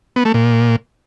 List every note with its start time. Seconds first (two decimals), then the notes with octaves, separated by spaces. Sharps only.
0.16 B3
0.25 A3
0.34 A#2